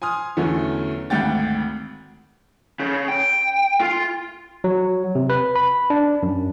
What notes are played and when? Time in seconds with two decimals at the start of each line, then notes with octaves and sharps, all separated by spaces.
0.02 G#5 C6 D#6 F6
0.37 E2 D3 E3 F#3 A3 C#4
1.10 G#1 D2 F#5 G5 A6
2.80 C#3
3.08 G5
3.81 F4
4.64 F#3
5.15 C3
5.30 B4
5.56 B5
5.90 D4
6.23 F#2